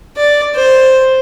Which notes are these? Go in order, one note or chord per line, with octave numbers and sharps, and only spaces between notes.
D5
C5